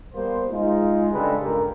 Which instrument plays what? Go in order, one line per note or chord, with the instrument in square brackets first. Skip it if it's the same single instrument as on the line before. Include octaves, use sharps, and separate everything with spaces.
[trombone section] G3 A#3 B3 C5
G#3 D#4 F4
C#3 G3 G#3 D4 A4 B4
C#2 G2 A#2 G4 A#4